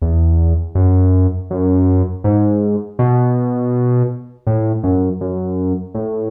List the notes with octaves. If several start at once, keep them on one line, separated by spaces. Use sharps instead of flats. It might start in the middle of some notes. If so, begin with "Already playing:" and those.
E2
F#2
F#2
G#2
B2
A2
F#2
F#2
A2